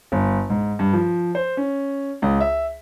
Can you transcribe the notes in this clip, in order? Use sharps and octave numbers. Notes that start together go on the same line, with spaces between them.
G1
G#2
G2
F3
C5
C#4
C#2
E5